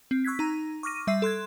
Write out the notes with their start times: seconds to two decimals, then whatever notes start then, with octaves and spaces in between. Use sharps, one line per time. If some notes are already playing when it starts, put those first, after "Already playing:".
0.11 C4
0.25 C#6 E6 F#6 G#6 B6
0.39 D#4 A#5
0.83 C#6 D6 F6 A#6 D#7
1.07 G3 E5 E6 C7
1.22 A4 C6 F#6 G#6